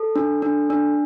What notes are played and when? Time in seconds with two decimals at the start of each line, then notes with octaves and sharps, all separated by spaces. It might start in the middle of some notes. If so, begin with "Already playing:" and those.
Already playing: A4
0.16 D4
0.42 D4
0.70 D4